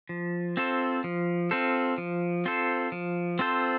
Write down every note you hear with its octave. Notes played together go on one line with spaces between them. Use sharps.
F3
C4 F4 A4 C5
F3
C4 F4 A4 C5
F3
C4 F4 A4 C5
F3
C4 F4 A4 C5